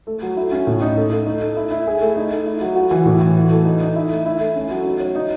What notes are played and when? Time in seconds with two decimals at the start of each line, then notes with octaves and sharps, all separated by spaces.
0.07 A3
0.22 F#3
0.37 E4
0.52 C#4
0.67 A2
0.82 D#4
0.97 A3
1.12 A3
1.27 D#4
1.41 A4
1.56 E4
1.71 E4
1.87 G#4
2.01 A3
2.16 D#4
2.32 A3
2.46 E4
2.61 F#3
2.75 F#4
2.91 E3
3.06 A2
3.21 E3
3.36 F#4
3.51 A4
3.66 D#4
3.81 D#4
3.96 E4
4.11 A3
4.25 E4
4.40 A3
4.55 C#4
4.71 F#3
4.86 D#4
5.00 C#5
5.15 D#4